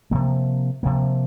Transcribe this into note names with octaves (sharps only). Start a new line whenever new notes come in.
C3 F3 A#3
C3 F3 A#3